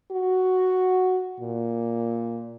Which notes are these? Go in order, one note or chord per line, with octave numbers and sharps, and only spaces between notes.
F#4
A#2